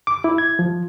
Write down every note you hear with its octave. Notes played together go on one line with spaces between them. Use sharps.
D6
E4
G#6
F3